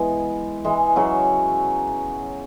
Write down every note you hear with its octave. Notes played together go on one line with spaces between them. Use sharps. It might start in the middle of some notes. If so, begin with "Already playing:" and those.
Already playing: E3 G#3 B3
E3 G#3
C#3 F#3